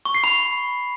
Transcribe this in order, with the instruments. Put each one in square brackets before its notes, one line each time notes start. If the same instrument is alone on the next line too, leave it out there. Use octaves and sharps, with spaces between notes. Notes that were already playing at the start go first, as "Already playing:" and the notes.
[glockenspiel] C#6
C7
B5